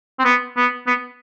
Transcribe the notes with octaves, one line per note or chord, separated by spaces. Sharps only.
C4
B3
B3
B3